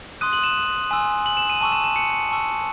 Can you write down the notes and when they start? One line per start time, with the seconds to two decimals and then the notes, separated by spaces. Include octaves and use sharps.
0.21 C6 D#6 F#6 D#7
0.33 F#7
0.44 E7
0.91 G#5 C6 E6
1.26 F#7
1.37 E7
1.49 D#7
1.61 A5 C#6 E6 D#7
1.72 E7
1.84 E7
1.96 C#7
2.31 A5 C#6 E6